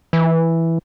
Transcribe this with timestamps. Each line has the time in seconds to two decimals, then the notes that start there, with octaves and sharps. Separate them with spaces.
0.13 E3